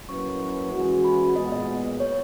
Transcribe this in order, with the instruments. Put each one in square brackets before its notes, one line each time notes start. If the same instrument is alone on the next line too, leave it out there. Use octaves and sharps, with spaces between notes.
[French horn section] F#3 A#3 C#4 E4 B4 [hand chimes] C#6
[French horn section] E3 G#3 C#4 F#4
[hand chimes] B5
[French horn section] A#2 G#3 B3 [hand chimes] D#5
[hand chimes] D#5
C#5